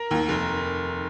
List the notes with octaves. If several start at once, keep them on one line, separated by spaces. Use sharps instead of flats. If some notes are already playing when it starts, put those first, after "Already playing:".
Already playing: A#4
D#2 D#3
F1